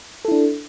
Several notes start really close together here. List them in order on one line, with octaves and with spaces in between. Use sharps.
A4 E4 D4